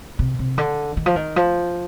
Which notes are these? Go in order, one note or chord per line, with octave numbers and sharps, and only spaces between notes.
C3
C3
D3
D#3
F3
D#3
F3